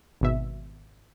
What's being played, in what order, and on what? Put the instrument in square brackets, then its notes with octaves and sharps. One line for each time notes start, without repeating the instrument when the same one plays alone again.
[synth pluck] G#1 B2 E5